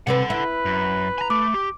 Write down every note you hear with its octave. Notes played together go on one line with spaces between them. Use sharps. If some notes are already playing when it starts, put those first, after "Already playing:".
C3 C4 A4 B4 F#5
E4 B4
F#2
G#5 A#5
A3 D6
G4